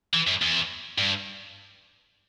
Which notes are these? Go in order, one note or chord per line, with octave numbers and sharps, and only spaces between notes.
E3
F#2
E2
G2